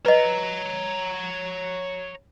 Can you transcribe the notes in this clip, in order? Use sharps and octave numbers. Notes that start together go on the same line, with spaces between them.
B4 C#5 D#5 A#5